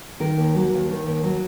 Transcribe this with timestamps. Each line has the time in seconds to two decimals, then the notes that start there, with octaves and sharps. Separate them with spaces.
0.20 D#3 A#4
0.38 D#2
0.55 F#3
0.73 D#2
0.89 D#3
1.07 D#2
1.23 F#3